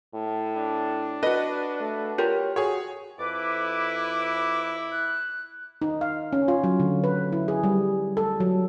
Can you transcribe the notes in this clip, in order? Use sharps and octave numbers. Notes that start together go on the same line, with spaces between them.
A2
D4
F#4 B4 D#5
A3
F4 G4 A#4 C#5
F#4 G#4 C#5
F2 E4 B4 D6
F#6
D#4
F5
C#4
F4
F#3
D3
B4
E4
G#4
G3
A4
F#3